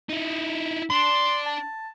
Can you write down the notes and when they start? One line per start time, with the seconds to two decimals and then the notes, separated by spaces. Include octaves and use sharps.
0.09 D#4 E4
0.90 D4 C6
1.46 A5